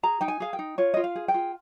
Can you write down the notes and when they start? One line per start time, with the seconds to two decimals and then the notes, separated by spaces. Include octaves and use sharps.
0.03 G#4 A#5
0.21 D#4 G5
0.28 G#5
0.40 G#4 F5
0.53 G5
0.59 D#4
0.78 F4 C#5
0.94 F4 D#5
1.04 F5
1.16 G#4
1.28 G5
1.34 F4